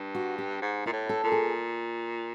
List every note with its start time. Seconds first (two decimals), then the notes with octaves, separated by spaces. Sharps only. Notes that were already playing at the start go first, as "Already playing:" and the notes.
Already playing: G2
0.15 F#4
0.38 G4
0.62 G#2
0.86 A#2 E4
0.93 A2
1.09 A4
1.24 A#2
1.32 G#4